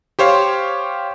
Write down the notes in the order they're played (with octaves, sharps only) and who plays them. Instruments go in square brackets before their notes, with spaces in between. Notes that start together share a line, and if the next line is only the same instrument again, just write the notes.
[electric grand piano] G4 C5 C#5 F5